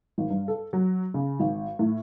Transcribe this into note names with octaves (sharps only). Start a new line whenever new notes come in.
G#1
G2
A4
F#3
C#3
G#1
A2